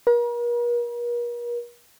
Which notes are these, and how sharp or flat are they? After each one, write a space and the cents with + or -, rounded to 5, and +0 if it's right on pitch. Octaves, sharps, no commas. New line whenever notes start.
A#4 +45